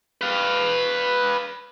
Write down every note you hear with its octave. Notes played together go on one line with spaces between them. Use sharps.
B4 F5